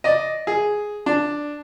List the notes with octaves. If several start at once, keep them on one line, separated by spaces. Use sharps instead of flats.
D5 D#5
G#4
D4